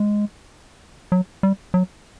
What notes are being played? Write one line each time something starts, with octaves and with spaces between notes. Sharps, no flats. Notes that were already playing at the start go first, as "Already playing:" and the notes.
Already playing: G#3
F#3
G3
F#3